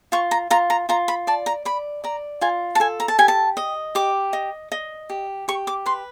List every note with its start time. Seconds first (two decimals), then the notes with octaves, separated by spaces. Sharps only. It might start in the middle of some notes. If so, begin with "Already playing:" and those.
0.12 F4 C#6
0.31 A#5
0.50 F4 A#5
0.70 A#5
0.89 F4 A#5
1.08 B5
1.27 D5 A5
1.46 A#5
1.65 D5 B5
2.04 D5 A#5
2.41 F4 G#5
2.75 A5
2.80 A4 G#5
3.00 A#5
3.08 A5
3.18 G4 G#5
3.28 A5
3.57 D#5
3.95 G4 D6
4.33 D#5
4.72 D#5
5.10 G4
5.48 G4 C#6
5.67 D6
5.86 B4 C6